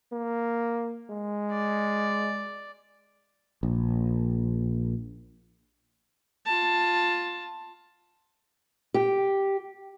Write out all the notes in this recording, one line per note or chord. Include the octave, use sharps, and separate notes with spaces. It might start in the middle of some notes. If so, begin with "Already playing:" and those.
A#3
G#3
D5
A#1
F4 A5
G4